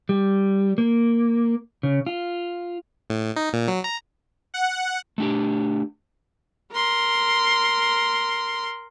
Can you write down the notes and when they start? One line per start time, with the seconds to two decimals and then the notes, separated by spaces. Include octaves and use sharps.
0.09 G3
0.78 A#3
1.83 C#3
2.06 F4
3.10 A2
3.36 D#4
3.53 A#2
3.68 F#3
3.84 A#5
4.54 F#5
5.18 A3 D4 G4
6.72 A#4 C6